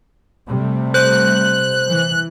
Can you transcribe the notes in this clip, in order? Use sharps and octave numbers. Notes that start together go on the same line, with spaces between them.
C3 G3 A3
C5 F#6
E3